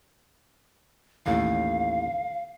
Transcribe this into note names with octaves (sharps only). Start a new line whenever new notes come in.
A1 D#2 A2 F5